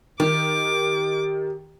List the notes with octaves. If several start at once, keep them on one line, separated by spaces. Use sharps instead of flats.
D#3 G4 D6